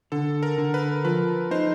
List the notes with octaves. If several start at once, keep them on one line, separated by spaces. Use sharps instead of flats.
D3 A4
A#4
D3
B4
F3 B4
D#4 C5